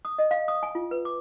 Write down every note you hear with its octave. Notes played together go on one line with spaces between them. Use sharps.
D#6
D#5
F5
D#6
G#5
F4
B4
D6